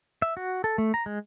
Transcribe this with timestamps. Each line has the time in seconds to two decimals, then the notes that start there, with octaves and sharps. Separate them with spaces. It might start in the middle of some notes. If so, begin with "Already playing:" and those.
0.22 E5
0.37 F#4
0.64 A4
0.78 A3
0.94 A#5
1.06 G#3